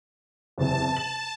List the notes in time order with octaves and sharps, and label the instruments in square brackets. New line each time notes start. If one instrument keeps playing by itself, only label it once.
[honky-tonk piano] F#1 E2 C3 [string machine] A5
[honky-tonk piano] F#7